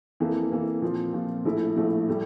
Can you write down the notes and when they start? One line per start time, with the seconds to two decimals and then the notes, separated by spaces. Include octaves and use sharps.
0.20 F2 E3 A#3
0.51 F2 E3 A#3
0.82 A#2 F3 C4 F4
1.13 A#2 F3 C4 F4
1.45 A#1 A2 F3 A3 E4
1.76 A#1 A2 F3 A3 E4
2.09 A2 G3